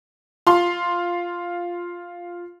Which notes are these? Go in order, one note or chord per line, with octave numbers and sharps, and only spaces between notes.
F4 C6